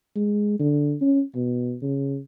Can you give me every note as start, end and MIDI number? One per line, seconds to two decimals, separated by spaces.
0.16 0.55 56
0.59 0.95 50
1.01 1.22 61
1.35 1.76 47
1.82 2.18 49